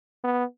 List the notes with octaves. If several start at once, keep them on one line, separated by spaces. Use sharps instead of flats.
B3